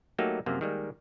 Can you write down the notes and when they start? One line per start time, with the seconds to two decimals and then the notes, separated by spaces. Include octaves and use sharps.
0.18 F#3 A3 A#3 D#4 F#4 G4
0.46 F#2 C3 F3 A#3
0.61 D#3 G3 G#3 A#3